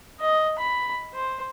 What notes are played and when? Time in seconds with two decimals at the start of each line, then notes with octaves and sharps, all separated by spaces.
0.20 D#5
0.59 B5
1.14 C5